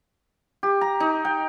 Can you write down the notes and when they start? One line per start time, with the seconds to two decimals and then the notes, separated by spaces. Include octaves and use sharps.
0.63 G4
0.81 A#5
1.00 D#4
1.25 G5